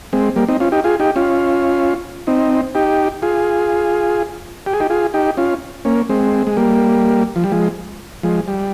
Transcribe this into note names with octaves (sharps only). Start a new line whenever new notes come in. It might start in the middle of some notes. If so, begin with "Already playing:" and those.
G#3 C4
G3 A#3
C4 D#4
C#4 F4
D#4 G4
F4 G#4
D#4 G4
C#4 F4
C4 D#4
D#4 G4
F4 G#4
G4
G#4
D#4 G4
F4 G#4
D#4 G4
C#4 F4
A#3 C#4
G#3 C4
G#3
G3 A#3
F3
G3
F3 G#3
F3 G#3
G3